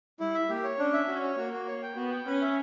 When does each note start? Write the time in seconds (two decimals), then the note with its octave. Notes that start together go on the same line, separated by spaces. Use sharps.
0.20 G3 E4
0.34 E5
0.49 A#3 G4
0.64 C#5
0.79 C#4 D4
0.93 E5
1.08 C#4 F#4
1.23 C#5
1.37 A#3 F#4
1.53 F#4
1.67 C#5
1.82 G5
1.96 B3 F#4
2.11 G5
2.27 C#4 B4
2.41 E5